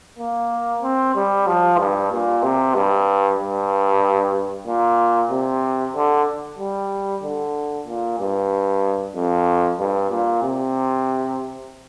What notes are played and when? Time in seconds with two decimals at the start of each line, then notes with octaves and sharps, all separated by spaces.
0.19 A#3
0.83 C4
1.15 G3
1.47 F3
1.79 G2
2.11 A#2
2.43 C3
2.75 G2
3.39 G2
4.67 A#2
5.30 C3
5.95 D3
6.59 G3
7.23 D3
7.87 A#2
8.19 G2
9.15 F2
9.79 G2
10.10 A#2
10.43 C3